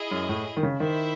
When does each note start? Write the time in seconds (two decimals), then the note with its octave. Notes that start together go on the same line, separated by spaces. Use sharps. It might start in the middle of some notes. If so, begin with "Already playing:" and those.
Already playing: E4 G#4 D#5
0.11 F#2
0.29 A2
0.57 D#3
0.63 C#3
0.80 D#3 E4 C5 E5